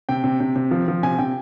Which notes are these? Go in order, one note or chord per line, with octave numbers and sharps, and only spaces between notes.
C3 G5
C3
C3
C3
F3
F3
C3 G#5
C3 G5